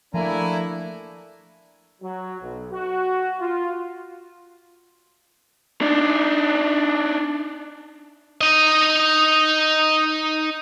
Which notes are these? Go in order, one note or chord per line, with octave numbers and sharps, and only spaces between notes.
F3 A3 A#3 D4 E4 G#5 A#5
F#3
B1
F#4
F4
D4 D#4
D#4 D#5